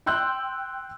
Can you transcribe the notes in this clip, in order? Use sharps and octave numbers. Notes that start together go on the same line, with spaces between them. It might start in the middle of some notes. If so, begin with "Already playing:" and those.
G5 C6 E6 F#6 G6